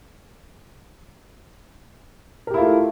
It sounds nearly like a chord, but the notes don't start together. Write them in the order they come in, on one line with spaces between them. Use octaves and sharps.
A#4 G4 E4 F4 A3